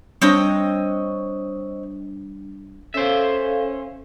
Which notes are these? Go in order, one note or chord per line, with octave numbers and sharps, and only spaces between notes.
G3 C4 D4 C#5 D#5
C#4 A4 C5 E5 F5